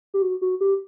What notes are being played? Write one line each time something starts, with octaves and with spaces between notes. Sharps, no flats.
G4
F#4
F#4
G4